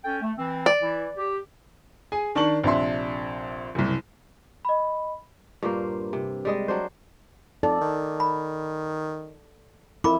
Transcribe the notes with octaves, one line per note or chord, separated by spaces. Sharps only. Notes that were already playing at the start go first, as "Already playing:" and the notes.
C#4 A4 G5
A3
E3 C4
D5
E3 E4
G4
G#4 G#5
D#3 D4 A5 C#6 F#7
A#1 C3 D4 E5 C6
F#1 C2
D#5 B5
G2 A#2 A#3 C5
C3
G3 G#3 D#5
F#3 D4 C5
F2 D#4 A4 D5
D#3
B5
F2 E4 A#4 B5 D6